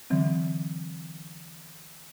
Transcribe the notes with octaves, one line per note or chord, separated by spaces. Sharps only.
D3 E3 F#3 C4